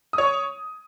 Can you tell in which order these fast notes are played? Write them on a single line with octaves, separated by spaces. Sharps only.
D#6 C#5 C#6